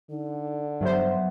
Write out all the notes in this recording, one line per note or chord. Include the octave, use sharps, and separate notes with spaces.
D3 D#4
G2 F#3 B3 C5 E5